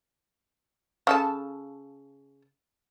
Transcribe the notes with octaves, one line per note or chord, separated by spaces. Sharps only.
C#3 A4 A5